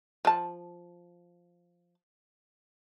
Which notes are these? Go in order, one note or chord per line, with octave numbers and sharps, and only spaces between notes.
F3 A5